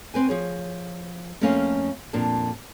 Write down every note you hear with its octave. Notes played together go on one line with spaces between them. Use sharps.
C4 B4 G#5
F3 G#4 C#5
F2 A3 A#3 C#4 F5 G#5
F2 A#2 D4 A5